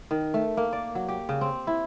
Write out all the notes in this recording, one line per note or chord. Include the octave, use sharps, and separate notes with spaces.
D#3
A3
A#3
D5
F#3
G4
C#3
C4
E4